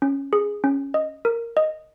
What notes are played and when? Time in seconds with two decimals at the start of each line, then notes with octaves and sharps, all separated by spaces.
0.02 C#4
0.33 G#4
0.64 C#4
0.94 D#5
1.25 A#4
1.57 D#5